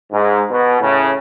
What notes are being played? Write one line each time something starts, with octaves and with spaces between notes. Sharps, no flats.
G#2
B2
A2 C#3